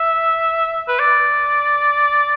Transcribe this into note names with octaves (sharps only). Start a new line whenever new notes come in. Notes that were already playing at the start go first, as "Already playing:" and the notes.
Already playing: E5
B4
D5